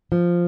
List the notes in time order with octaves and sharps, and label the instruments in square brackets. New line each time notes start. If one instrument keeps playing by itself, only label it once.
[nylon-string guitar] F3